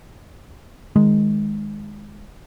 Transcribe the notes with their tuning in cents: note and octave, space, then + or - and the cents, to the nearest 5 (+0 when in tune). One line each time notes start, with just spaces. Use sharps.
D#3 +0 G#3 +0